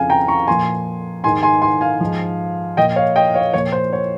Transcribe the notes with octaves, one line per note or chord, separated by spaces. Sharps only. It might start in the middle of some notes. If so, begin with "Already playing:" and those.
Already playing: F2 C#3 F3 F5 G#5
G5 A#5
A#5 C#6
A#2 F3 G#5 C6
G#2 D#3 G#5 C6
G#5 C6
G#5 C6
F5 G#5
G#2 F3
A#2 F3 D#5 G5
C#5 F5
D#5 G5
C#5 F5
A#2 F3 C#5
C5
C#5